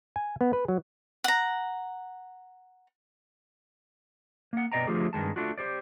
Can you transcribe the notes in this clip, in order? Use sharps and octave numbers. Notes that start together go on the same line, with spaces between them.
G#5
B3
B4
F#3
F#5 A#5
A#3 F#5
B2 E3 D5 D#5 G5 A#5
D3 F3 A3 F4 G4 G#4
G2 D#3 G#3 A5
A3 D4 F4 F#4
G4 C5 D5